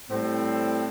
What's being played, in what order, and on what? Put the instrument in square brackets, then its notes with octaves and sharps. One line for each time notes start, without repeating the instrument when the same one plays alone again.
[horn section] A2 G3 C4